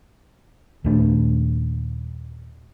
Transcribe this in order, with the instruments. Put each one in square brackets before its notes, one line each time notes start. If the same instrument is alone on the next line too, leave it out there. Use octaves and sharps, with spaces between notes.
[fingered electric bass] D#2 A#2 A3 D4